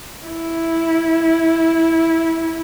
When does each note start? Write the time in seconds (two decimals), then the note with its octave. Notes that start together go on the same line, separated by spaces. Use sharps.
0.24 E4